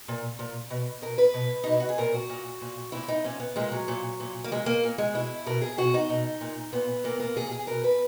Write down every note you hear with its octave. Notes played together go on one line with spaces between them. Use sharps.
A#2
A#2
B2
B2 A#4
B4
B2
B2 D#4
E4
F#4
G#4
A#2 A#4
F#4
A#2
A#2
A#2 E4
D#4
A#2 C#4
B3
A#2 G#3
F#3
A#2
A#2
A#3
A#2 G#3
A#3
A#2
G#3
B2 E4
B2 A#4
G#4
B2 F#4
D#4
B2
A#2
A#2 B3
A#2 A#3
B3
A#3
A#2 G#4
G#4
B2 A#4
B4